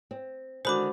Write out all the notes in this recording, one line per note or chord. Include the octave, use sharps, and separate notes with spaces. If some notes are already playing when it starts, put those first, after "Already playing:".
C4
D3 D#3 G#3 F#4 C5 B5 D6